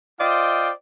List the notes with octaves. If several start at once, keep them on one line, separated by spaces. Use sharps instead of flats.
F4 C5 D5 D#5 F5 G5